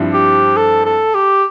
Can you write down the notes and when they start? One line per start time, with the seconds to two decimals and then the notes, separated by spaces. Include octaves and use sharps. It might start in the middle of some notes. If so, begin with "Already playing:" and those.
Already playing: G2 F3 C4 E4
0.14 G4
0.57 A4
0.85 A4
1.14 G4